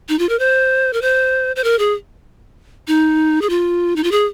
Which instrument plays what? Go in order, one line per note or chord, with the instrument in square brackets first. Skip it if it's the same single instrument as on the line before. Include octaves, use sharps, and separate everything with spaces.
[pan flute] D#4
F4
A#4
C5
A#4
C5
C5
A#4
G#4
D#4
G#4
F4
D#4
F4
G#4